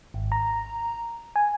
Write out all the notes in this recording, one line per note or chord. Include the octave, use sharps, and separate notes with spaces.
G#1
A#5
G#5